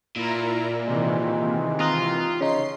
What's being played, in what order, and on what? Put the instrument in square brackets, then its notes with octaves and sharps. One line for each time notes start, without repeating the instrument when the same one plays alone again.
[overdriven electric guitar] A#2 [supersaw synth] E4 A#4 A#5
[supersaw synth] C3 D#3 E3 [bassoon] G#3
[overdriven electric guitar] F4 [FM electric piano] A#5 D#6 F#6
[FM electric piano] C#3 D#4 [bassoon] C#4 [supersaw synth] C6 C7